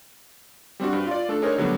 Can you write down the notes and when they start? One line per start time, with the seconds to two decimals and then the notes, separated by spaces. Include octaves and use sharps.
0.80 G3 C4 D4 F#4
0.93 G2
1.07 F4 D5
1.29 A3 D4 A4
1.42 D4 D#4 G#4 A#4 C5 C#5
1.58 D3 F#3 G3 A3 B3 D4